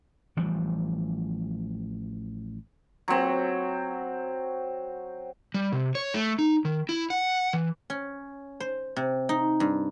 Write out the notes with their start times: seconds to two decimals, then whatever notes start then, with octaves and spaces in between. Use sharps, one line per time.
0.37 A1 E3 F3 G3
3.08 F#3 C4
5.54 G3
5.72 C3
5.95 C#5
6.14 A3
6.39 D#4
6.65 D#3
6.89 E4
7.10 F#5
7.53 E3
7.90 C#4
8.60 C5
8.96 C3
9.29 D#4
9.60 G2